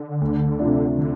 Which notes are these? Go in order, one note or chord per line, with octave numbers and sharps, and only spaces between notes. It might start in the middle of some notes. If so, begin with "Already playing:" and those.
Already playing: D3
D2
C3 F3 A3 D4
D3